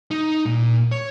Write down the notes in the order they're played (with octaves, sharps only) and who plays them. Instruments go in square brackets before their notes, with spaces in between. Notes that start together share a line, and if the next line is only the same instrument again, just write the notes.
[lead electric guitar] D#4
A#2
C#5